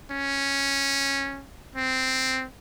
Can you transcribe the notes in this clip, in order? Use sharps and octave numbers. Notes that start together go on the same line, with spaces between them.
C#4
C4